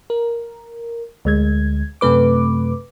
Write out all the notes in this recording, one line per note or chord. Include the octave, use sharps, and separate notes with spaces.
A#4
D2 G#3 G#6
F#2 C3 A3 B4 D6